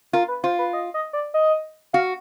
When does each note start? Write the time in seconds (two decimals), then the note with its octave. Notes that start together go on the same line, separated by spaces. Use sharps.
0.13 F4 A#4
0.28 B4
0.43 F4 C5
0.59 B4
0.73 D#5
0.94 D#5
1.13 D5
1.34 D#5
1.93 F#4 F5